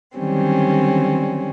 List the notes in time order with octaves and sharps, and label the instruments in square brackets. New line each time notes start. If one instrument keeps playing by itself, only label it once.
[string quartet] D3 D#3 F#3 G3 C4 C#4